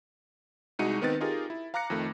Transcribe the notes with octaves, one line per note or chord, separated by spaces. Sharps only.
C2 G#3 D#4 F#4 C#7 D#7
D#3 B3 C4 D#4 B4 A6
D#4 F4 G4 G#4 A#4
E4
F5 A#5 D6 F#6 A#6 C#7
F2 D#3 A3